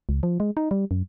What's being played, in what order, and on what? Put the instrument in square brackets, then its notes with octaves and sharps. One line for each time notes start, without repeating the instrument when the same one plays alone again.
[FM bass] C#2
F3
G#3
D#4
G3
F#2